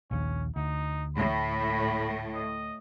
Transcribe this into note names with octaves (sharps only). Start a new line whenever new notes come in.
A#1 D#2 C#4
D2 D#4
A2 B5
D#5